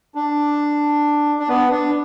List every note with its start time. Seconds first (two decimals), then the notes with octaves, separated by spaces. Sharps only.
0.15 D4
1.39 D4
1.49 B3
1.71 D4